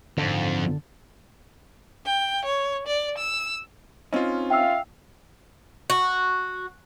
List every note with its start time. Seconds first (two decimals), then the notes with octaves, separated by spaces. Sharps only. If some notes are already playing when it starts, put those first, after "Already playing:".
0.17 F#1 F2 G#2 D3
2.06 G5
2.45 C#5
2.87 D5
3.18 E6
4.13 C4 C#4 D#4 F4
4.50 E5 F5 G5 E6
5.90 F#4